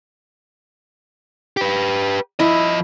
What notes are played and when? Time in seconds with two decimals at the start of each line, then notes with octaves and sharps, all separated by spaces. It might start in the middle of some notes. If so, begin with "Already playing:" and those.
1.57 G4 B4
2.40 F3 E4 D#5